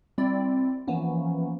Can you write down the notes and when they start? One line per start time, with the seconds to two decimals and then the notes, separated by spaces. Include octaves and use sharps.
0.18 G3 C4 E4 D5
0.88 E3 F3 A#3 B3 C#4